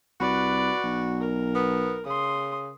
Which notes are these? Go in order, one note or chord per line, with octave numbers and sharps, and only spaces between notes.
C2 F#4 B4 D5
B1
A#4
B3
C#3 C6 D#6